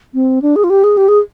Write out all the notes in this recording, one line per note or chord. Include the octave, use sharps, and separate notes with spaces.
C4
D4
G#4
F4
G4
G#4
G4
G#4